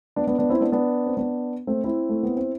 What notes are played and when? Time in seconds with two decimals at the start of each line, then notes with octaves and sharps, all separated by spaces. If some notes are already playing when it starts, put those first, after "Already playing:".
0.16 B3 D4
0.27 B3 D4
0.38 B3 D4
0.50 C4 E4
0.61 B3 D4
0.72 B3 D4
1.06 C4
1.17 B3 D4
1.67 A3 C4
1.84 C4 E4
2.09 A3
2.23 B3
2.37 C4